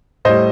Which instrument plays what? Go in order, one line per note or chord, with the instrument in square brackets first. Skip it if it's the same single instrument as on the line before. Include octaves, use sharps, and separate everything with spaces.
[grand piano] A2 G3 C5 D#5